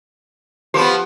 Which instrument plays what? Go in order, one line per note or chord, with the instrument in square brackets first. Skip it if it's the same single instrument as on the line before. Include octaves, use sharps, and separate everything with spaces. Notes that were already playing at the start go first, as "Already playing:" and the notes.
[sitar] F3 B3 [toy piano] G4 D6